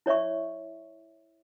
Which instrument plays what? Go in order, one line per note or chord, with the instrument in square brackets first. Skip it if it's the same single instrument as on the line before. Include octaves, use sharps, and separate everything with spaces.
[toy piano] E4 C#5 D5 E5 C#6